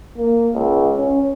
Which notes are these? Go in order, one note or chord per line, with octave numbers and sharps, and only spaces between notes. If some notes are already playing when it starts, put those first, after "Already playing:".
A#3
C#2
C#4